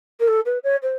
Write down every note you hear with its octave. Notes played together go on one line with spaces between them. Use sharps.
A#4
A4
B4
C#5
C5